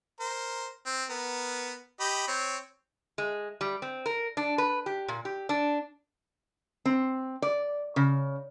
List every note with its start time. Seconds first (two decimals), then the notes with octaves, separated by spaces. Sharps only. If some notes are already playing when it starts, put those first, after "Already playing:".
0.20 A#4 C5
0.86 C4
1.10 B3 A#4
2.00 G4 D#5 B5
2.27 C4 C#5
3.18 G#3
3.61 G3
3.82 C4
4.06 A#4
4.37 D4
4.58 B4
4.86 G4
5.08 A#2
5.25 G4
5.49 D4
6.85 C4
7.42 D5
7.96 C#3